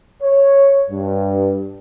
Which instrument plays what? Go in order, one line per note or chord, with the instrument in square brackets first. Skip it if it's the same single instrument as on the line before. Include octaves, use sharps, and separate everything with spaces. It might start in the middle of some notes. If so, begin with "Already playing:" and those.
[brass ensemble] C#5
G2